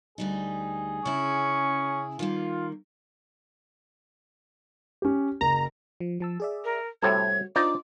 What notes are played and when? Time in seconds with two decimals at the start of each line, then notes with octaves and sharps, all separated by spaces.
0.18 D2 G3 D#4 G#4
1.05 C#3 C#4 E4 C#6
2.19 D#3 G3 A#3 F4
5.02 C#4 G4
5.41 F#1 A#5
6.00 F3
6.20 F3 A5 E6
6.40 G#4 D5 E5
6.64 A#4
7.02 A2 C3 G3 F#4 A4 G#6
7.56 D4 D#4 F4 C5 D5 D6